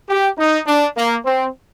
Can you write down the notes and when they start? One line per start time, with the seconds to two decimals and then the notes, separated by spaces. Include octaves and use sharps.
0.09 G4
0.39 D#4
0.67 D4
0.97 A#3
1.25 C4